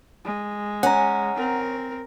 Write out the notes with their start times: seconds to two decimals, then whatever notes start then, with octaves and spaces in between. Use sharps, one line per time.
0.25 G#3
0.83 C#4 F#5 A#5
1.36 C4 A#4